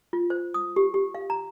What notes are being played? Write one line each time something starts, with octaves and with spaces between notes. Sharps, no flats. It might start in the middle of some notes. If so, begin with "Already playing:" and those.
F4
C5
D#6
G4
G4
F5
A#5